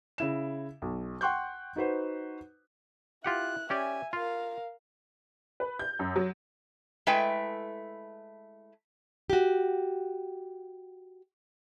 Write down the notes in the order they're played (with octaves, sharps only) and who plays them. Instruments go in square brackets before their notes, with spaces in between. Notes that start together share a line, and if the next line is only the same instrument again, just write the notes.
[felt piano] C#3 E4 E7
B1
F#5 G5 C6 C#6 F#6 G6
D#4 F#4 B4 C5
[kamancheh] E4 F#6 [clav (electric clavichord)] F4 G4 F#5
[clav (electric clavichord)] C#4 G4 D5 [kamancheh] E5 G#5
[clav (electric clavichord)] F4 [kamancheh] A#4 F5
[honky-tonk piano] B4
G6
F#2
F#3
[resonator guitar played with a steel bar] G#3 A3 E4 B4 G5
[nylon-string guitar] F#4 G4